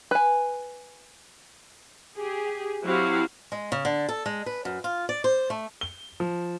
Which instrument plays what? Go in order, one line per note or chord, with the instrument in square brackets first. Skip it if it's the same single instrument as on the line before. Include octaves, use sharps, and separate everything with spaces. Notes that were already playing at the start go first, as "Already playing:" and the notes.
[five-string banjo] B4 G#5
[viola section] G4 G#4
F#3 C4 E4 F#4 G4 F5
[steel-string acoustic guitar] G#3
C#3
D3
A4
G#3
B4
F#2
F4
D5
C5
A3
[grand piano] G7
F3